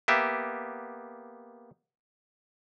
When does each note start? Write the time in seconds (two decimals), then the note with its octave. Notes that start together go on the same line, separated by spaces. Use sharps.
0.08 A#3 B3 G4 E5